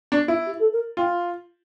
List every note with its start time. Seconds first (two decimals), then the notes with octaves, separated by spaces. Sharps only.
0.12 D4
0.28 E4
0.46 G4
0.59 A4
0.72 A#4
0.97 F4 G5